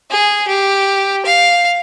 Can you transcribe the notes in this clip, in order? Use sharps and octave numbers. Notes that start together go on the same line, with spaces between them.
G#4
G4
F5